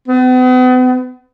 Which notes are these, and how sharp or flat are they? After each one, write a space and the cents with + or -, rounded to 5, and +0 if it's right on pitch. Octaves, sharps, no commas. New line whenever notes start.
B3 +40